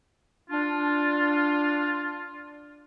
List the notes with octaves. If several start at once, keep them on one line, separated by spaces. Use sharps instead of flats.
D4 F4